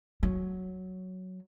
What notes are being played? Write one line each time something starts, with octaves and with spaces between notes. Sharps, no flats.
F#3